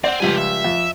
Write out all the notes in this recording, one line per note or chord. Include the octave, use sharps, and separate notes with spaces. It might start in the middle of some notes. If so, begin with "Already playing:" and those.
C4 D5 F#5
C#2 F3 G3 G4 G#5
E5
F2